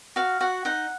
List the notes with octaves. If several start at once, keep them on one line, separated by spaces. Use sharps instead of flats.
F#4 F5
F#4 F#5
D#4 F#5